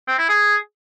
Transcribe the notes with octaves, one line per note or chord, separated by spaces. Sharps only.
C4
E4
G#4